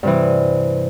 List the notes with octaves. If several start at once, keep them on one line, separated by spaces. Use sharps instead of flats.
G2 C3 E3